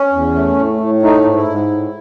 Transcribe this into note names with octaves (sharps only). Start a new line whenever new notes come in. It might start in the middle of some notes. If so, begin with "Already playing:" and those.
Already playing: C#4
E2
A3
A2
A2
A3 D#4
G#2
E4
G#2
A2